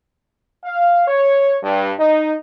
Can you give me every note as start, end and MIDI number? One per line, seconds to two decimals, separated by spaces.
0.64 1.04 77
1.08 1.57 73
1.63 1.92 43
2.00 2.34 63